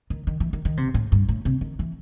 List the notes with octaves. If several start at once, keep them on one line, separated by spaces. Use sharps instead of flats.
D#3
D#3
E3
D#3
D#3
C3
A2
G2
A2
C3
D#3
E3